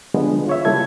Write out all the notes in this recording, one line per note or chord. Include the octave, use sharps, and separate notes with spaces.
D3 F3 G3 G#3 B3 D4
F4 C#5 E5
C#3 G3 A#3 E4 A4 G#6